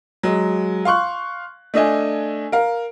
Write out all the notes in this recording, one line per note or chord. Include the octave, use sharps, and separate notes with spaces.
F#3 G#3
F5 C6 C#6 F#6
A3 D4 D#5 G#5
A#4 F5